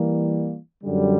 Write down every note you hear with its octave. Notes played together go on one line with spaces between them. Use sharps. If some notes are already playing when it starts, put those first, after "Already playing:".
Already playing: E3 G3 A#3
F#2 D3 G3